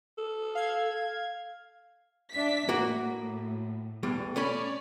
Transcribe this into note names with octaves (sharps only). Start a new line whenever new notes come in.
A4
F5 G#6
D4 E5 B6
A2 A#3 F#4
B1 E2 G3
A3 C#4 C#5 D5 B5